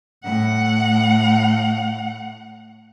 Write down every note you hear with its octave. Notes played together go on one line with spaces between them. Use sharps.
A2 F#5